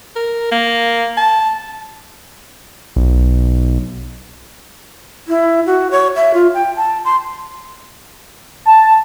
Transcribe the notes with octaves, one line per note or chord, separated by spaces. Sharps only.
A#4
A#3
A5
B1
E4
F#4
C#5
E5
F4
G5
A5
C6
A5